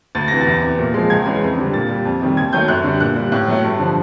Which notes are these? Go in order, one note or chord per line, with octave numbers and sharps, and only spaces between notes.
D2 A6
C3 E3 A#6
A6
E2
C3 E3
A#2
F3 G#3
C#2 G#6
C#3 E3 G#3
F2
D3 G3
A#2 A6
G3
F2
C3 D#3 G3
D#2 G#6
D#3 F#3 A3 G6
F#2 F#6
D3 G3
A#2 F#6
G3
A2 F#6
F#3 A3
G2
D3 F3